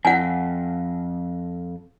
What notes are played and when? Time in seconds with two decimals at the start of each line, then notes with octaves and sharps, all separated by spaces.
0.05 F2 F#5 G#5